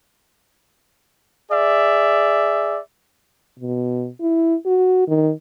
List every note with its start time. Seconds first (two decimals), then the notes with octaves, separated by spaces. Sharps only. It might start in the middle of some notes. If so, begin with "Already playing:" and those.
1.50 G#4 D5 E5
3.59 B2
4.21 E4
4.66 F#4
5.08 D#3